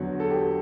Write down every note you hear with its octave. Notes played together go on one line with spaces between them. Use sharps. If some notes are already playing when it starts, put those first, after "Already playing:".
Already playing: E2 D3 F#3
A4
G4